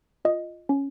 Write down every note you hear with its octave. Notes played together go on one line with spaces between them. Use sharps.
F4 D#5
C#4